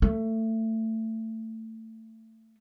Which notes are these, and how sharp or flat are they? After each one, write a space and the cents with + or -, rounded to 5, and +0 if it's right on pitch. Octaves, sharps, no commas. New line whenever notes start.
A3 +20